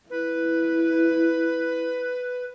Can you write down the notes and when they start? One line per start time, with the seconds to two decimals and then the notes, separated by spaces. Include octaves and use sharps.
0.10 E4 B4